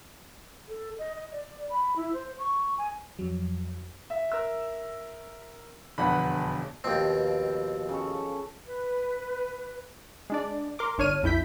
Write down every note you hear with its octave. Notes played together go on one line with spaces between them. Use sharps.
A4
D#5
D#5
D5
B5
E4
C5
C#6
G#5
F2 F#3
E5
A#4 E6
E1 F2 D3 B4 F#5 B5
D#2 B2 F3 C4 G5
C#3 A4 C#6
B4
G#3 D4 D5
A#4 C6 D6
G1 D4 C#5 F6 D#7
B1 F2 E4 G6 B6